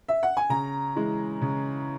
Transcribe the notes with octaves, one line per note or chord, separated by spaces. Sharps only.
E5
F#5
G#5
C#3 A#5
E3 G#3
C#3